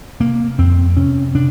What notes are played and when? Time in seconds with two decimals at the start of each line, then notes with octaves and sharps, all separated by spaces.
0.20 C3 A#3
0.58 F2 C4
0.97 C3 C#4
1.34 C3 D4